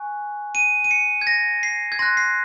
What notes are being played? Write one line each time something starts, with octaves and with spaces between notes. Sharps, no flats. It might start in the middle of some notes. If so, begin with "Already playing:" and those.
Already playing: G#5 C#6 F#6
D#7
D#7
C#7
G#6
A#6
C7
G#6
C6 F#6 A#6
C7